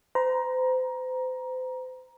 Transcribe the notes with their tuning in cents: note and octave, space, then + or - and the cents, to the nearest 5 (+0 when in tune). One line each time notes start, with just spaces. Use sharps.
C5 -35 A#5 +20